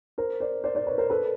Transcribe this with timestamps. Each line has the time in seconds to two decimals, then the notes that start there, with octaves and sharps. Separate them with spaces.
0.18 A#4 C5
0.40 C5 D5
0.64 C5 D5
0.75 C5 D5
0.86 B4 C#5
0.98 A#4 C5
1.10 A4 B4